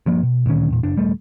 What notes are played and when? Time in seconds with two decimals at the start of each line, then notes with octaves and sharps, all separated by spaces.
0.06 G2 F3 A#3
0.23 B2
0.46 D2 A#2 D#3 C#4
0.70 E2 A#2
0.83 F#1 D4
0.96 D#1 G3 A3